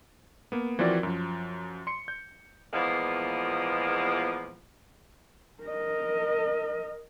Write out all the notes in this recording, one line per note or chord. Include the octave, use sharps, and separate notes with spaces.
A#3 B3
E3 F3 C4 F#4 A#4 D5
F#2 F3
C6 C#7
G6
E2 A#2 F3 G#3 A#3 B3
A#4 D#5